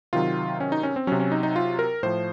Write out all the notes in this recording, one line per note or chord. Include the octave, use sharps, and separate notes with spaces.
C3 D#3 F#3 F4
C#4
D#4
C#4
C4
C3 F#3 C#4
C#4
D#4
D#4
F4
A#4
A2 F3 C5